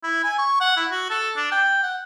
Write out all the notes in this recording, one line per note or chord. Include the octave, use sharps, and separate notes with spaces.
E4
G#5
C#6
F#5
E4
F#4
A4
D4
G5
F#5